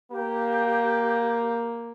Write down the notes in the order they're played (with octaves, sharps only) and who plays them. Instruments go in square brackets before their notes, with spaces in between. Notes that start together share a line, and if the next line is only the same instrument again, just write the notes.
[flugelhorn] A#3 [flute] G4